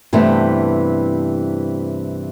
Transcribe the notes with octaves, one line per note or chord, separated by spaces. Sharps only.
G2 C3 E3 A3 B3 C4